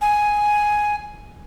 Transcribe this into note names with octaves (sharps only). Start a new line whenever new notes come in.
G#5